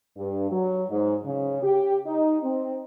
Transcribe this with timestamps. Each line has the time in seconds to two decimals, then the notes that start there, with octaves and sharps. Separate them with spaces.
0.16 G2
0.52 F#3
0.89 G#2
1.25 C#3
1.63 G4
2.07 D#4
2.43 C4